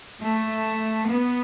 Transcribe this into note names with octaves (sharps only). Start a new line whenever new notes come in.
A3
B3